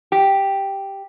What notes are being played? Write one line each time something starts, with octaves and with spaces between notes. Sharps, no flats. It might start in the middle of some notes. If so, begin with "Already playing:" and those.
G4